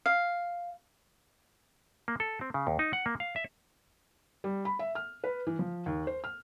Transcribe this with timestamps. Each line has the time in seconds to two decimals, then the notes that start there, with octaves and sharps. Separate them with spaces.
0.06 F5
2.08 A#3
2.20 A4
2.41 C4
2.54 C#3
2.67 D#2
2.79 D#4
2.93 F#5
3.06 A#3
3.20 F5
3.36 E5
4.44 G3
4.65 B5
4.79 E5
4.95 F6
5.24 B4
5.47 E3
5.59 F3
5.86 D#2
6.07 C5
6.24 F6